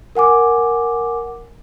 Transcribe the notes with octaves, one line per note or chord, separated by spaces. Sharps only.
A#4 F#5 G#5 D6